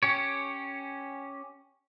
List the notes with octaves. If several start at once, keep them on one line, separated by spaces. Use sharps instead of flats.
C#4 G4 C#5